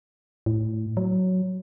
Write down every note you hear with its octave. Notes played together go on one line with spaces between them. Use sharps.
A2
F#3